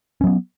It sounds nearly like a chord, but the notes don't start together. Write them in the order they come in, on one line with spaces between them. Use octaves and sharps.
C#4 F#3 B3